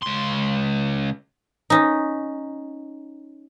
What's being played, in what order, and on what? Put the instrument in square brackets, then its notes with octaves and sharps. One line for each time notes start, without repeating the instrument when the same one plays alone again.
[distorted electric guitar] C#2 C6
[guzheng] C#4 D#4